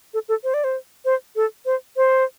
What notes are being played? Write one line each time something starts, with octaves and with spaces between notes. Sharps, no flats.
A4
A4
C5
D5
C5
C5
A4
C5
C5